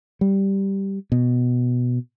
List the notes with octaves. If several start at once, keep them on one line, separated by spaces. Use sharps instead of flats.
G3
B2